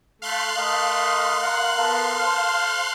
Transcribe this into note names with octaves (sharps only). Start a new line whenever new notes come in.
A3 F5 C6 F#6
A3 A#4 D#5
A#4 F#5
B3 A4 A#4
A4 C5 F6